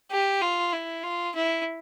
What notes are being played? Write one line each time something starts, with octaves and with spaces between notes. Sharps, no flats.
G4
F4
E4
F4
E4